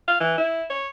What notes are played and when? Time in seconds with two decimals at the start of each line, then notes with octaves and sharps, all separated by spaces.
0.08 F5
0.20 E3
0.38 E4
0.70 C#5